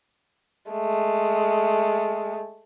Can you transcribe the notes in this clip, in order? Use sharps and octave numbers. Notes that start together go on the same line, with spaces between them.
G#3 A3